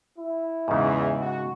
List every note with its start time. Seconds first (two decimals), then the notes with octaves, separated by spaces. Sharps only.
0.18 E4
0.68 E2 G#2 C#3
1.19 F#4